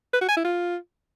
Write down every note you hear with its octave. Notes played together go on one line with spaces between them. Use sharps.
B4
F#4
G#5
E4
F4